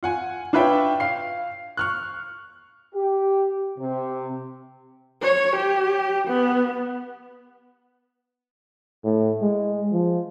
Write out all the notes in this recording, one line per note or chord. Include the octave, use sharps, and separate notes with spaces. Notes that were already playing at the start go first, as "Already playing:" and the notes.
F4 F#5 G#5
D4 F4 B4 C#5 E5 G5
F5 C7
C#6 F6 F#6
G4
C3
C#5
G4
B3
A2
G#3
F3